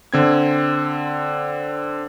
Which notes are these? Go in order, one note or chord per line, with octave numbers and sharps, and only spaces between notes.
D3 C4 G#6